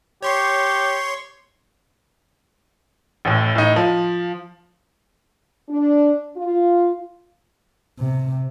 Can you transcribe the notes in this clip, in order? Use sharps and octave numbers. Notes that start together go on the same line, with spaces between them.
G4 C#5 C6 C#6
A1 A2
A2 D#4
F3
D4
F4
C3